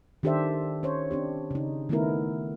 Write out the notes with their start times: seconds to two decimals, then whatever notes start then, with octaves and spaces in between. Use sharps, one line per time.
0.23 D#3 D4 G4 A4 C5 E5
0.83 C#4 C5 C#5
1.11 C4 D4 G4
1.51 C#3 D#4
1.89 D#3 A3 B3 D#4 E4 A#4